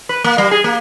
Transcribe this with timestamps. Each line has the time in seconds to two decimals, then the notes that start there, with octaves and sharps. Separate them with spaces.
0.09 B4
0.24 A#3
0.38 G3
0.51 G#4
0.64 A#3